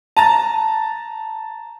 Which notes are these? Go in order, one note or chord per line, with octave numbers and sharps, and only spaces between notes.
A5 A#5 A6